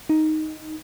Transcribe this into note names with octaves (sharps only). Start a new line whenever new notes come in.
D#4